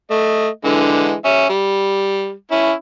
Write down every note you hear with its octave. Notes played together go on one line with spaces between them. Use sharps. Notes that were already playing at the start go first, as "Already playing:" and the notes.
A3 D#5
D3 E3 G#3
C#4 E5
G3
C#4 E4